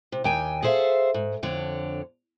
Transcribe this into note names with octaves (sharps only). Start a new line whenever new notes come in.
C3
D#2 G5 G#5
G#4 A4 C5 D5 E5 F5
G#2
F2 D3 C#5